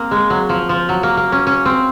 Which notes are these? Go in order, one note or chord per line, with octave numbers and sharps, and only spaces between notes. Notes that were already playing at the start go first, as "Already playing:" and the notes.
Already playing: A#3 C4
G#3
F#3
F3
F3
F#3
A#3
A#3
C#4
C#4
C4